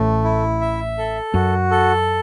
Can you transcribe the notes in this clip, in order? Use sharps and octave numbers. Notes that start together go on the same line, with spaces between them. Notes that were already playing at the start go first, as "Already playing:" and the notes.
Already playing: A1 A2 A3
E4
E5
A4
F#2 F#4
A4